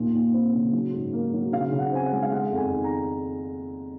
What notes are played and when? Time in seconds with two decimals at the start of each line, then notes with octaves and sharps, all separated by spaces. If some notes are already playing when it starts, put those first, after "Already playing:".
Already playing: D#2 A#2
0.13 D#2
0.34 C4
0.54 C#3
0.73 F#3
0.93 G#2
1.13 A#3
1.33 F#3
1.53 C#3 F5
1.72 C#3
1.79 F#5
1.92 C4 G#5
2.06 F#5
2.12 G#3
2.22 F5
2.31 G#3 F#5
2.51 F2
2.57 G#5
2.71 D#3
2.84 A#5